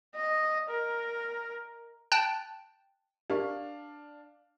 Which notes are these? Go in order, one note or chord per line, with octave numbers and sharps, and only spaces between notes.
D#5
A#4
G5 A5 F#6
D4 G4 A#4 F5 C#6